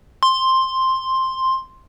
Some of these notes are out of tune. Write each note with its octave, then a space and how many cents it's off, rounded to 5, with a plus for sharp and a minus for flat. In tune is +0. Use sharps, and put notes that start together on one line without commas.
C6 +5